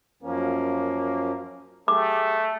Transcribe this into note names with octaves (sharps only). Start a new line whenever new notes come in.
F#2 F3 A#3 C#4
A3 G4 G#4 D6